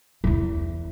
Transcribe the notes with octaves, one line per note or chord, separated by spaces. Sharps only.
E2 E3